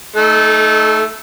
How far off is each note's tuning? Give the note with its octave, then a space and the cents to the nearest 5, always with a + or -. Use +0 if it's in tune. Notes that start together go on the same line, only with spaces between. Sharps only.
A3 +0 D#4 +0 A4 -30